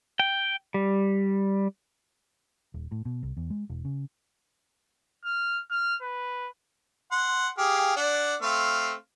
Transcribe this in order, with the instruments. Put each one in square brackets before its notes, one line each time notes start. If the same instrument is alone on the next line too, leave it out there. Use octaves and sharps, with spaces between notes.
[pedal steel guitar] G5
G3
[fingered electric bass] D#1
A2
B2
C2
E2
G#3
E1
C#3
[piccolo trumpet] F6
F6
B4
[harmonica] F#5 C6
G4 G#4 F5
D4 D5 F#5
A3 C4 F5